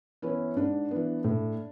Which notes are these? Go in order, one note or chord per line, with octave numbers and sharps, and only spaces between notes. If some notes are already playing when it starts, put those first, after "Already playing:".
E3 B3 C#4 E4
G#2 D4
E3 B3
A2